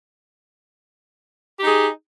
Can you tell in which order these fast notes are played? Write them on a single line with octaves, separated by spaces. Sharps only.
G4 D#4 G#4